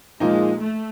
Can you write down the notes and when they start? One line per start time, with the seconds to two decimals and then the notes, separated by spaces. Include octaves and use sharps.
0.20 A#2 F3 G#3 A#3 D#4
0.61 A3